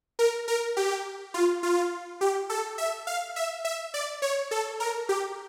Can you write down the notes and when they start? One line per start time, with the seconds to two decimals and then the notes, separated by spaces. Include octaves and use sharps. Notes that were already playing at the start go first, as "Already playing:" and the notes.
0.19 A#4
0.48 A#4
0.77 G4
1.34 F4
1.63 F4
2.21 G4
2.50 A4
2.78 E5
3.07 F5
3.36 E5
3.65 E5
3.94 D5
4.22 C#5
4.51 A4
4.80 A#4
5.09 G4